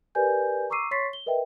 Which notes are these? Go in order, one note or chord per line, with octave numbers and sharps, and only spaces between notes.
G4 A#4 B4 D5 G#5 G6
A#5 C#6 D6 E6 C7 D#7
C#5 C6 C#6 A6 B6 C7
G7
A#4 B4 D#5 E5 G5